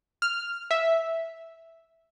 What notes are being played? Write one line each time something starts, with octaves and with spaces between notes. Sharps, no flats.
F6
E5